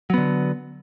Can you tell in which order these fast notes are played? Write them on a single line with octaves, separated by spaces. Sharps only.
F#3 B3 D3